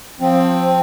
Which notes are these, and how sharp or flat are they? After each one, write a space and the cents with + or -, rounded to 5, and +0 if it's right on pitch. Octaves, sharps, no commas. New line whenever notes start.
F3 +20 C4 +0